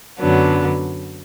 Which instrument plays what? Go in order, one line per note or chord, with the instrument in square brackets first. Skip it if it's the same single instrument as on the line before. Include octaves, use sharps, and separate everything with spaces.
[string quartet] F#2 D3 F#3 B3 D4